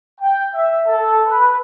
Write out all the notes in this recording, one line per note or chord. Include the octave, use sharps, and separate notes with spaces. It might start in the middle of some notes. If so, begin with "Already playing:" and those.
G5
E5
A4
B4